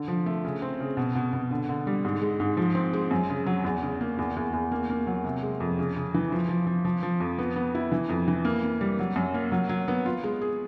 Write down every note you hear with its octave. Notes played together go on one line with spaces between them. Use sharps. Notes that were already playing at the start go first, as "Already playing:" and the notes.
Already playing: D3
F3
A3
C#3
C4
C#3
B2
B2
B2
D3
D3
G3
G#2
G#3
G#2
F3
C4
G#3
F#2
C#3
F#3
E2
C#3
A#3
E2
E2
E2
A#3
A#3
F#3
C3
G#3
F2
C#3
C#3
E3
F3
F3
F3
F3
F3
F2
B3
B3
E4
E3
F2
E3
A#3
A#3
G3
F#3
F#2
A#3
F#3
F#3
B3
F4
G#3
G#4